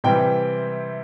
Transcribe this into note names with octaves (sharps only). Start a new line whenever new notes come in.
C3 E3 G3 G5